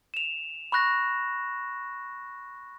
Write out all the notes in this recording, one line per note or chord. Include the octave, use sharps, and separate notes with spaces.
E7 F7
B5 C#6 F#6 A#6